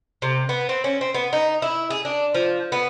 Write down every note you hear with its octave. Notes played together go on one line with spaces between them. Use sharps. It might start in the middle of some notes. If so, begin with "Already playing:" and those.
C3
B3
C4
C#4
C4
B3
D#4
E4
G#4
D4
F3
B3